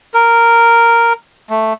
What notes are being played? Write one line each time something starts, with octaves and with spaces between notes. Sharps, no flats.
A#4
A3